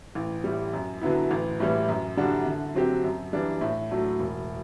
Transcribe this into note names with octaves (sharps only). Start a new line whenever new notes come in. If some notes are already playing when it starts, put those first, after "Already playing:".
A1
A2 G3
F#2
D3 F#3 B3 E4
A1
A2 E3 G3
F#2
D3 G3 D4 F#4
D3
F#3 C4 G4
F#2
E3 G3 D4
A2
F#3 A3 D4
E1